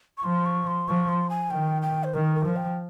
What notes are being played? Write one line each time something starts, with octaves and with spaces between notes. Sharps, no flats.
C#6
F3 C6
C#6
C6
F3 C#6
C6
G#5
D#3 G5
G5
C5
D#3 A#4
A#4
F3
G5